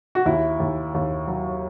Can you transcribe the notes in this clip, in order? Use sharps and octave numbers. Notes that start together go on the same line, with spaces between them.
F#4
D#2 E4
D#2
D#2
F#3